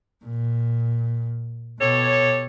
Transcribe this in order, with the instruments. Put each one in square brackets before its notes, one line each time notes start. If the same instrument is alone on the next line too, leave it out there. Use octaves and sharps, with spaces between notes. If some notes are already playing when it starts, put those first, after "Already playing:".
[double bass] A#2
[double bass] B2 [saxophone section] G4 A4 C#5